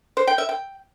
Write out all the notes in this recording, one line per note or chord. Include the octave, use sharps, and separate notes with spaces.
C5
G5
E5
G5